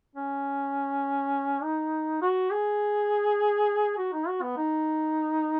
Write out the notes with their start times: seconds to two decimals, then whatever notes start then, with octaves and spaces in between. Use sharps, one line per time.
0.16 C#4
1.63 D#4
2.22 F#4
2.51 G#4
3.98 F#4
4.13 D#4
4.28 F#4
4.42 B3
4.57 D#4